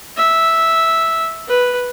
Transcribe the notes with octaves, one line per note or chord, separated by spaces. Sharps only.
E5
B4